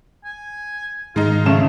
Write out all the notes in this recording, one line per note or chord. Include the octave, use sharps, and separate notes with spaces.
G#5
G#2 D#3 G#3 D#4 F4
F2 C#3 A3 E7